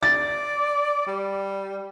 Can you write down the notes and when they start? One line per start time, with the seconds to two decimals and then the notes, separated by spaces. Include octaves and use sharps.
0.03 D5 A6
1.07 G3